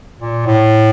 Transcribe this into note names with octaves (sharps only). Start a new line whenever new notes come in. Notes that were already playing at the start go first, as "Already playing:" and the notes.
A#2
A2